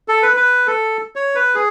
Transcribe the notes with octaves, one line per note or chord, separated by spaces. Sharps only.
A4
B4
B4
A4
C#5
B4
G#4